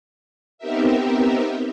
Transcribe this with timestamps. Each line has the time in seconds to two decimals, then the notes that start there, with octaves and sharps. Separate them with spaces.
0.58 B3 C4 D#4 G4 A#4 E5